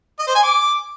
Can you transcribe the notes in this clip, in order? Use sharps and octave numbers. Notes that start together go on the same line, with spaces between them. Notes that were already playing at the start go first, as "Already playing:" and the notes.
D#5
C5
G#5
D6